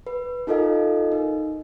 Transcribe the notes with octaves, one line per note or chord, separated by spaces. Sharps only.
B4
D#4 F4 A4 A#4 D#5 F5
D#4